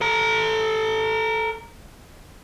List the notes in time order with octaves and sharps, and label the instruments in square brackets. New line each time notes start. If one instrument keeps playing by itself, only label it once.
[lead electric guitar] A4 A#5